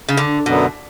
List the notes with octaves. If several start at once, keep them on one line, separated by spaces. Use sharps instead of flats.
C#3
D3
F#2 B2 D3 F#3 B3